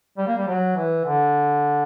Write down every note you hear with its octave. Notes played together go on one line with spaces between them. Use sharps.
G3
A#3
G3
F#3
E3
D3